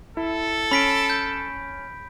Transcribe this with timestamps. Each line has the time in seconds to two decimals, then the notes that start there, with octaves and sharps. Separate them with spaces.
0.17 E4 A4
0.71 C#4 B5 B6 D7
1.10 G6